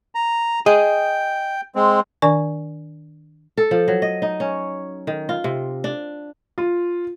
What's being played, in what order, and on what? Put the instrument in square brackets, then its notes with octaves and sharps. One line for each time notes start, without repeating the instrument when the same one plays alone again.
[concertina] A#5
[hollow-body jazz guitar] G#4 D#5 [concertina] G5
[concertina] G#3 C4
[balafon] D#3 D4 D5 G#5 C#6
[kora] A4
F3
F#3
D#5
D#4
C#4
D#3
F4
C3
D4
[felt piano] F4